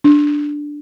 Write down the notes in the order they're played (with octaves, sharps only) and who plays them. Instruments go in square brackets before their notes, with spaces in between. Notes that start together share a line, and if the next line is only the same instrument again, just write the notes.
[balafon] D4